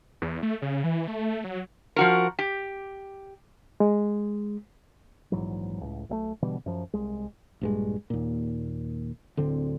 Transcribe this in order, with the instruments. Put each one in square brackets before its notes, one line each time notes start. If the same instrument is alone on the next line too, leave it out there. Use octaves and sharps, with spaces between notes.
[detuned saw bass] E2
A3
C#3
E3
A3
F#3
[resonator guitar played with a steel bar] F3 F#4 A#4
G4
[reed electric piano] G#3
[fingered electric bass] A#1 G#2 E3 F#3
C#2 A2
B1 G3 A3
B2 D3 E3 G3
F#2 F3
C2 G#3
A#1 G2 G#3
D#2 A#2
D1 D3 C4